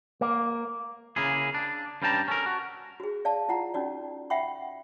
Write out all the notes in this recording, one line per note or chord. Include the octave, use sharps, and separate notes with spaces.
A#3
C#3 A#3 E4 G#4
D4
G2 G3 C#4 G5 A5 A#5
C#4 A4 A#4
F#4
F#4 G#4
D5 F5 A5
E4 F4 F#5 A#5
C#4 D#4 F#4 D5
E5 F#5 G5 B5 C#6